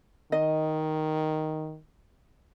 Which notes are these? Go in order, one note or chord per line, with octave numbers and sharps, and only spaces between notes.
D#3 D#5